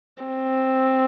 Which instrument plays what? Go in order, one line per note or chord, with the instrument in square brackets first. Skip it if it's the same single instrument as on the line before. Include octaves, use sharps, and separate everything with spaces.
[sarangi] C4